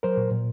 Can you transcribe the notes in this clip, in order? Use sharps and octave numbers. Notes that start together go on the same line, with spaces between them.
F#3 A#4 C5
A#2
A#2